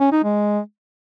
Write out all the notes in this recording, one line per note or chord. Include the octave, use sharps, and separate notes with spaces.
C#4
D#4
G#3